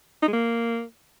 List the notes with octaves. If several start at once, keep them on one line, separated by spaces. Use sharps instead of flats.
D#4
G#3
A#3